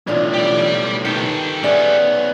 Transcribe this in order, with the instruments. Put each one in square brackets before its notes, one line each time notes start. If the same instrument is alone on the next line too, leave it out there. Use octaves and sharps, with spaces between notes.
[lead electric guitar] B1 A2 [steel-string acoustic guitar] E3 D4 F4
[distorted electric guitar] G4 D5
[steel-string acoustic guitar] D#3 B4 [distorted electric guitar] G4 A4
[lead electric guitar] B3 C#4 [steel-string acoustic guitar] G#4 D5 E5